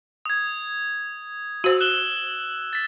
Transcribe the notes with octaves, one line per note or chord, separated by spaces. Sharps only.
D#6 G#6
F#4 C5 E6 F#7
F#6 E7 G7
A6 B6